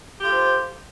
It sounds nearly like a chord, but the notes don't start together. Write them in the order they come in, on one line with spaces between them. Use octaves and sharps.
G4 F4 A4 C5